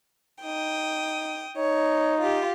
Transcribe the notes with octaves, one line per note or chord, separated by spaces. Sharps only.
D#4 G5 D#6
D#4 C#5
F4 G4